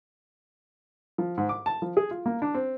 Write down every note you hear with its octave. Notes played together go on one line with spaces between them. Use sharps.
F3
G#2
D6
A5
F3
G#4
F4
A#3
D4
C4